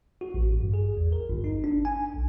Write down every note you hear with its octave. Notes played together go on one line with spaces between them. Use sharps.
F#4
A1
G2
G#4
E2
A#4
G1
D#4
D4
G#5
B1